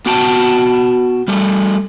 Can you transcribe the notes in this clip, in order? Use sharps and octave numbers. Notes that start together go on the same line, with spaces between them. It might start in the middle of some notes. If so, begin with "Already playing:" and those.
B3 F#4 G5 A5
G3 A3